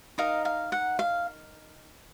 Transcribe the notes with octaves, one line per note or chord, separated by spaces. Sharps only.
D#4 A#4 D#5 F5
F5
F#5
F5